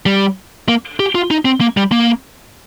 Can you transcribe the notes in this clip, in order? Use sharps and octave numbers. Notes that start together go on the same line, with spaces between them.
G3
A#3
G4
F4
D#4
C4
A#3
G3
A#3